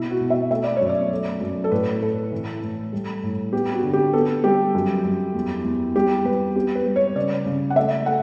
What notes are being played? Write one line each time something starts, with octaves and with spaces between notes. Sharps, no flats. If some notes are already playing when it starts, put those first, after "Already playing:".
Already playing: B2 E4
F#4
B2
E5
A3 E5
D5
F#2 C#5
D5
A3
F#2
A4
A2 B4
A2 A4
E3
A2
G3
A2
B3 G4
F#4
D3
G4
B3 A4
G3 G4
F#2
F#2
E2
E2
G3 G4
E2 B4
B3 G4
B4
G3
C#5
C#3 D5
C#3
F#5
A3 E5
A3 F#5